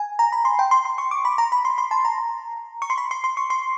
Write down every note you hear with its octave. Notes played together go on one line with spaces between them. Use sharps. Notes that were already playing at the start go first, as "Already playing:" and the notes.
Already playing: G#5
A#5
B5
C6
G5
C6
C6
C#6
D6
B5
A#5
B5
C6
C6
A5
A#5
C#6
C6
B5
C6
C6
C#6
C6